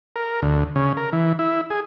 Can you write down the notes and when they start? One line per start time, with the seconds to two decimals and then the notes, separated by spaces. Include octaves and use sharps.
0.16 A#4
0.42 D2
0.76 C#3
0.97 A#4
1.13 E3
1.39 E4
1.70 G#4